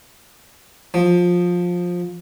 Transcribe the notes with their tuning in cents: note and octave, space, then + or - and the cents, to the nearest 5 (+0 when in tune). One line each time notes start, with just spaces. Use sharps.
F3 +15